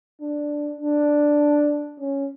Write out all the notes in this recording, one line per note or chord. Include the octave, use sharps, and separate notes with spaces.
D4
D4
C#4